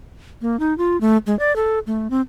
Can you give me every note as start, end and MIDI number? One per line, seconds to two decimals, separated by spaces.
0.42 0.59 58
0.60 0.76 63
0.78 0.99 65
1.01 1.17 57
1.27 1.37 56
1.39 1.55 74
1.56 1.79 69
1.87 2.08 57
2.10 2.21 60